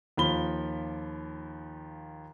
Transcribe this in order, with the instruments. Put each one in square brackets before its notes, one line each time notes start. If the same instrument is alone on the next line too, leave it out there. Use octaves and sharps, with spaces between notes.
[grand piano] D#2 F3 B5 G7